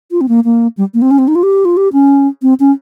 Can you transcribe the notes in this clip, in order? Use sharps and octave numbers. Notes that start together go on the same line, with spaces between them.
F4
C4
A#3
A#3
G3
A#3
C4
C#4
C4
D#4
F4
G4
F4
G4
C#4
C4
C#4